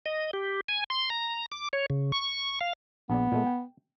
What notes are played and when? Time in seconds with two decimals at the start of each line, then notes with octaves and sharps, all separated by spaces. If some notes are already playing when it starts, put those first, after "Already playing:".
0.06 D#5
0.33 G4
0.69 G#5
0.90 C6
1.10 A#5
1.52 D6
1.73 C#5
1.90 C#3
2.12 C#6
2.61 F5
3.10 A#1 B3 G#4 D5
3.32 A#2 G#3 A3
3.46 G5